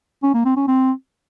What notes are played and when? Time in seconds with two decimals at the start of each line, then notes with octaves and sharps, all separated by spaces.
0.23 C#4
0.34 A#3
0.45 C4
0.57 C#4
0.68 C4